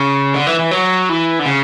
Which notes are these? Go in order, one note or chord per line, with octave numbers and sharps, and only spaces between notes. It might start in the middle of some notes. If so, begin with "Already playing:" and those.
Already playing: C#3
D3
E3
E3
F#3
E3
D3
C#3